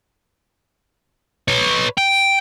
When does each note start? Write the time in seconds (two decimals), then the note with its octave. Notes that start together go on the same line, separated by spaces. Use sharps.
1.48 B4 C#5
1.98 G5